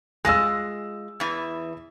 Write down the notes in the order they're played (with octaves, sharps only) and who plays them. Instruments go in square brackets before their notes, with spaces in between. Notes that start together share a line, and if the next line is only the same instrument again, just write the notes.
[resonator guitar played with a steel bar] G#3 F4 D#5 [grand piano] E6 A#6
[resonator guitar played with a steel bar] E2 E3